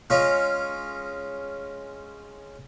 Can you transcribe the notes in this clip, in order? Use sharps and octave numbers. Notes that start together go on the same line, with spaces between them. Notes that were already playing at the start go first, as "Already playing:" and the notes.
G#3 C#4 F4